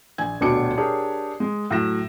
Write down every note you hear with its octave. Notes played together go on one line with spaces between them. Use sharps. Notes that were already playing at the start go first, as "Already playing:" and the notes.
A#1 G#5 G#6
D#1 D2 B2 D4 D6 C#7
D4 G4 G#4 A#4 C#5
G#3
A2 F#3 A#6 E7